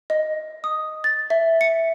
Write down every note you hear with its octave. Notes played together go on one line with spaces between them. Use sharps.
D#5
D#6
A6
E5
C#7